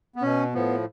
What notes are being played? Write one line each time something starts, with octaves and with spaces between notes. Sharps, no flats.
B3
B2 C#4
A2 F3 B3